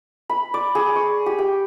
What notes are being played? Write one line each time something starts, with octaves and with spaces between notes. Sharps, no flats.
B5
D5
G#4
C#6
G4
G5